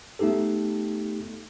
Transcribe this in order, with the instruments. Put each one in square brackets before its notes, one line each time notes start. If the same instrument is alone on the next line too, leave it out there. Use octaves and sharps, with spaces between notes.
[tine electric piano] A3 B3 D#4 G4 A4